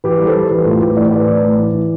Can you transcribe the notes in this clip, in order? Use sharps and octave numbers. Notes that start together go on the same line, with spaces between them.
E3 G4 B4
G3
A4 C5
G3
E3 G4 B4
A2 F4 A4
A2 G4 B4
E3 D5
C5
A2 B4 D5
E3
A2
E3
E3